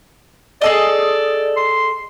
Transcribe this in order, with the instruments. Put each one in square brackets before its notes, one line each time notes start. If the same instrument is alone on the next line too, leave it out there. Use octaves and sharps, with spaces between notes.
[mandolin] G#4 A4 D#5 [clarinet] D5
[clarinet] C6